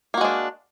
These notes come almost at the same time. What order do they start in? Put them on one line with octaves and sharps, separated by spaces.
A#3 F#4 G#3 D4